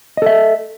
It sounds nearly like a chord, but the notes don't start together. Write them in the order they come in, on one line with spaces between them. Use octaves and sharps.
D#5 A4 E5